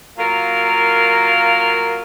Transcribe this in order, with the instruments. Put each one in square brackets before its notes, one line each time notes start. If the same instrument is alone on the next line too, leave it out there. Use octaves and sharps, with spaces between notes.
[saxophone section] F#3 A#3 F4 A#4